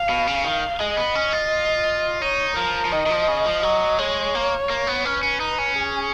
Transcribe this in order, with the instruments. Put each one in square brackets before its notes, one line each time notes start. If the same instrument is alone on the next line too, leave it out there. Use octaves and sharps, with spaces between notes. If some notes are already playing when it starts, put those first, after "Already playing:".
Already playing: [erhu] F5
[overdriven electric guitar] B2
C#3
D#3
[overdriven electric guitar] G#3 [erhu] D#5
[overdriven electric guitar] B3
C#4
F4
[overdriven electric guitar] D#4 [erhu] C#5
[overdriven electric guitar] F3 [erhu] A#4
[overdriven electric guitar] F3
[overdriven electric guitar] D#3 [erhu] D#5
[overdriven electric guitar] D#3
F3
C#3
F3
[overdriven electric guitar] F#3 [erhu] D#5
[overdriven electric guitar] G#3 [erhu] C#5
[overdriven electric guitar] A#3
A#3
B3
[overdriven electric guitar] C#4 [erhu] B4
[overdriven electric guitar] C#4
D#4
C#4
[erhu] G#4